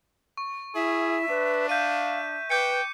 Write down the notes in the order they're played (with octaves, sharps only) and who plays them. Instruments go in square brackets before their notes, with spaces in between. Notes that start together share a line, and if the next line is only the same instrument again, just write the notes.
[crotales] C#6
[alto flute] E4 [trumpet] G#4 [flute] E5
[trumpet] D4 [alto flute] B4
[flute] E5 [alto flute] F5 [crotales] G6 D#7
[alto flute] B4 [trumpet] G5 [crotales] D6 G6 C#7